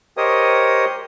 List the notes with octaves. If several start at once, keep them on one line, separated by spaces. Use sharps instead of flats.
G4 A#4 C5 C#5 D#5 D#6